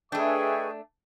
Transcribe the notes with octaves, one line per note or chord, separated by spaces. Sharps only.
A3 D4 G#4 B4 D#5 E5 G5 C#6